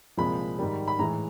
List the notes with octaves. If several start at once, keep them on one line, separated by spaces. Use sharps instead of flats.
C2 A#2 F3 G#3 B5
G#2 D#3 G3
B5
A2 E3 G#3 A#5